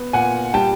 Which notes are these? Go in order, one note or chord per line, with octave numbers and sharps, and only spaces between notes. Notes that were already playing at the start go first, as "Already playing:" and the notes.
Already playing: B3
A#2 F#5 G#5
G3 G5 A5